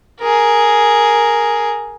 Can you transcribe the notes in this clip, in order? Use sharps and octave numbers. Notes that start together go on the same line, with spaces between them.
G#4 A#4